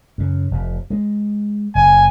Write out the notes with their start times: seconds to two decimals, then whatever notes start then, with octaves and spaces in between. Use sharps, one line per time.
0.18 F#2 C#3
0.51 F1 F2 C3
0.90 G#3
1.75 F#1 G#5